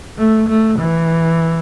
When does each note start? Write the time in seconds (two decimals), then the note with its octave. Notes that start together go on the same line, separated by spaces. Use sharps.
0.18 A3
0.49 A3
0.79 E3